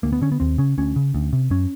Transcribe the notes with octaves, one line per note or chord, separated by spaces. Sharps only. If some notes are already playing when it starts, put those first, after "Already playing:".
D2 A#3
B3
D3 C#4
B3
D#2 C4
C#3 C#4
D2 C#4
C#3
D2
C3
F#2 C#4